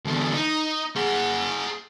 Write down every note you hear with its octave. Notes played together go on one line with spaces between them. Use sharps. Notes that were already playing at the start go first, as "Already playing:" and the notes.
E2 D3
D#4
G#4 F#5